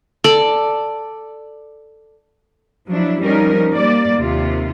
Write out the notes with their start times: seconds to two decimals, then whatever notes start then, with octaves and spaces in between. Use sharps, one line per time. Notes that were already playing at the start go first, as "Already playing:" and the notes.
0.24 A4 D5
2.87 F3 F#3 D4 E4
3.21 F3 G3 C#4 D#4 A#4
3.73 G3 A#3 D5
4.19 D#2 C3 F4